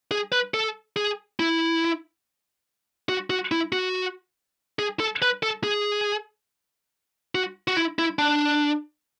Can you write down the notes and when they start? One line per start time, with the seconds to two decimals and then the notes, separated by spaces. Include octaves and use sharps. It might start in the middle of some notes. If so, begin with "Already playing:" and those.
0.11 G#4
0.32 B4
0.54 A4
0.97 G#4
1.40 E4
3.09 F#4
3.30 F#4
3.52 E4
3.72 F#4
4.79 G#4
5.00 A4
5.22 B4
5.43 A4
5.64 G#4
7.35 F#4
7.68 F#4
7.77 E4
7.99 E4
8.19 D4